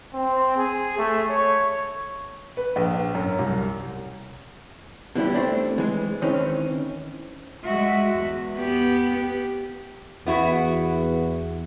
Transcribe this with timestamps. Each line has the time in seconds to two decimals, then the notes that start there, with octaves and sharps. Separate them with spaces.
0.14 C4
0.57 G#4
0.98 A3
1.30 C#5
2.57 B4
2.76 A#1
3.15 F#2
3.39 C2
5.15 B2 E3 G3 E4
5.34 A3 C4 D4
5.78 E3 G#3
6.22 D#3 E3 C4 C#4
7.63 G#3 F#4 E5
8.16 E2
8.58 B3 G4
10.26 E2 B3 E4 F#4